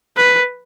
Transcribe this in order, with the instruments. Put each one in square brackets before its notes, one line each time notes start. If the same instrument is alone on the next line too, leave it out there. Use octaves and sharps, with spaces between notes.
[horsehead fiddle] B4